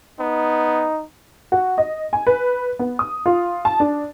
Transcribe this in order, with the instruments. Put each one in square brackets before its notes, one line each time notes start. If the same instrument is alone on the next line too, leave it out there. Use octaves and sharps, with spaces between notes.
[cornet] B3 [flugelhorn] D#4
[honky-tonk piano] F#4
D#5
G#5
B4
B3
D#6
F4
A5
D4